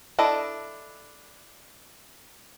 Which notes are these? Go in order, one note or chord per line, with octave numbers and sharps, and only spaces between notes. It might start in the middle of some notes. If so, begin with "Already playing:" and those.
D4 E4 A4 D#5